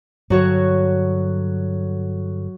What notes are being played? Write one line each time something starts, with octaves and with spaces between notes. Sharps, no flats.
G2 D3 F#3 F#4 C#5